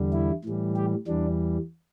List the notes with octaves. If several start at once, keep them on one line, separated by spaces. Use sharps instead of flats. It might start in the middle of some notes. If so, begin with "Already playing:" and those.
Already playing: E2 D3 G3
E4
A2 E3 G3
G4
E2 E3 G3 D4